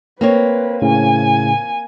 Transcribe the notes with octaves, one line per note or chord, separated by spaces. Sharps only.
A#3 C4 B4 C#5
A2 C#3 G#5